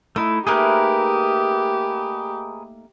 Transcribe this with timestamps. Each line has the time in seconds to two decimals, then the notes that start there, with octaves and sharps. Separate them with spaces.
0.16 A3 D#4 E4
0.47 A3 A#3 D#4 G4 G#4 A#4 B4